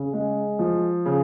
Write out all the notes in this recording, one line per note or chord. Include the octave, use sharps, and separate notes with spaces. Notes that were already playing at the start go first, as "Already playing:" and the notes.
Already playing: C#3
G#3
F3
C#3